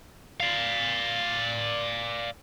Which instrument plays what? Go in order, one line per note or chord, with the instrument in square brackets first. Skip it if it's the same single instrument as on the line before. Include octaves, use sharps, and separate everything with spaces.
[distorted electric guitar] D5 F5